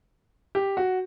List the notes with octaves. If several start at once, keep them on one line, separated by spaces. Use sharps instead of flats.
G4
F#4